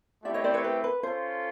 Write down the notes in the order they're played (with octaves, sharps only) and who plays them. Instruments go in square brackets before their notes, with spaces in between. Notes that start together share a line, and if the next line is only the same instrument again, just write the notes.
[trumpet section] A3 C4 E4 G4 [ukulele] D5 E5
[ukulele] C#5 D#5
C5 D5
B4 C#5
B4
B4
[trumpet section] C#4 F4 A4 [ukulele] C5